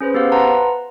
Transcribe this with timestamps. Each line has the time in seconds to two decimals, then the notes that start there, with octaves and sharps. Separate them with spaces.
0.01 C#4 G#4 B4 C5
0.14 B3 G4 C5 F5
0.32 B4 F#5 A5 A#5 C6